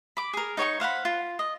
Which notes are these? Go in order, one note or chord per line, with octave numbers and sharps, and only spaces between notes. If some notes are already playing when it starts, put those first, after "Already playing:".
B5 D6
G#4 A#4
D#4 C#5 G5 C#6
C5 F5 F#5 B5
F4
D#5